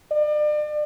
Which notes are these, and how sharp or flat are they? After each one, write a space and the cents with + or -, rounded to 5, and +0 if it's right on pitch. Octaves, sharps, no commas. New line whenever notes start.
D5 +35